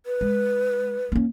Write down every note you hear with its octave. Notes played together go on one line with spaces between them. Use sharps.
B4
G#3
A#3 C#4